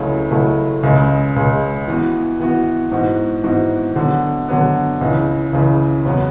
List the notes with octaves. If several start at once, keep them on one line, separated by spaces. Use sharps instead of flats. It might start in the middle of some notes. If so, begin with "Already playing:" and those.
Already playing: C#2 C#3 F#3 A3 E4
C#2 C#3 F#3 A3 E4
C#2 C#3 G#3
C#2 C#3 G#3
E3 B3 F#4
E3 B3 F#4
G#2 E3 B3 F#4
G#2 E3 B3 F#4
D3 F#3 B3
D3 F#3 B3
C#2 C#3 E3
C#2 C#3 E3
E2 C#3 F#3 B3